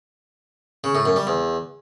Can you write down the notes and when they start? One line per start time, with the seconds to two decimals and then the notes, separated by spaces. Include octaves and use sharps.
0.84 C#3
0.95 A2
1.06 F#2
1.16 G3
1.27 E2